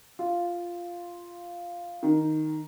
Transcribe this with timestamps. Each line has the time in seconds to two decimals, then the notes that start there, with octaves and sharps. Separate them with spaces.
0.19 F4
2.03 D#3